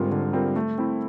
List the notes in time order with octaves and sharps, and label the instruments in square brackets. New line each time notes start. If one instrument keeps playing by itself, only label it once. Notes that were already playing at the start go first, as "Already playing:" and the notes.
Already playing: [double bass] G#2 [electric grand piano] D3 G3 C4 F4 A#4
[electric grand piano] D3
G3 C4 F4 A#4
A3
C4 E4